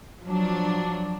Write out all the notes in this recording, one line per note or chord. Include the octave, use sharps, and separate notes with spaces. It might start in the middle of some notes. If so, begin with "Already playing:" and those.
F3 F#3 D4